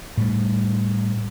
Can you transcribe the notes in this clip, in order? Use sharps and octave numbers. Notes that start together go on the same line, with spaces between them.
A2 G3